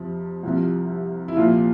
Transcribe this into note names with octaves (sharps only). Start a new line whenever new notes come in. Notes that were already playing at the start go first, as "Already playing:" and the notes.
Already playing: F2 C3 F3
C2 C3 F3
E4
C2 A#2 F3 F4